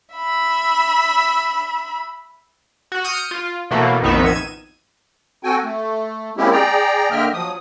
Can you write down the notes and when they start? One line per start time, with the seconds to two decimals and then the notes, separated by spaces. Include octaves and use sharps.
0.14 E5 B5
2.92 F#4
3.04 D#6 F6 G6 C#7 D#7
3.31 F4
3.71 B2 E3 F#3 A3 A#3
4.02 A#1 F2 D#3 B3 D#4 E5
4.26 G#6 D#7 E7
5.43 C4 F#4 A4 G5 G#5
5.64 A3
6.37 G#3 A#3 C4 C#4 E4 G4
6.52 G#4 D5 G5 A#5
7.11 D3 A#3 D#5 E5 G5 F6
7.33 F3 F#3 D#6